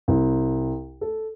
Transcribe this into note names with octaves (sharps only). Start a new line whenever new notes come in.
C2
A4